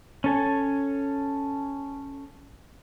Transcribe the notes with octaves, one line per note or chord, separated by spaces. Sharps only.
C#4 A4 G#5